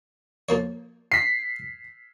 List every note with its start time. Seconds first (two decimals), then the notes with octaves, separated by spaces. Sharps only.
0.49 F3 A#3 C#5
1.12 B6 C7